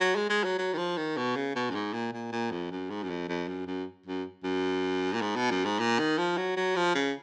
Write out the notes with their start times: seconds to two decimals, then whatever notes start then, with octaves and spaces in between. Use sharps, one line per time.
0.01 F#3
0.16 G#3
0.30 G#3
0.44 F#3
0.58 F#3
0.73 D#3
0.78 F3
0.97 D#3
1.17 B2
1.36 C#3
1.56 B2
1.70 F#2
1.75 G#2
1.93 A#2
2.13 A#2
2.32 A#2
2.51 F2
2.71 F#2
2.90 G#2
3.03 F#2
3.10 F2
3.29 F2
3.48 F#2
3.67 F#2
4.06 F#2
4.44 F#2
5.13 A#2
5.21 G#2
5.36 B2
5.50 F#2
5.65 G#2
5.79 A#2
5.99 D#3
6.18 F3
6.37 F#3
6.57 F#3
6.76 F3
6.95 C#3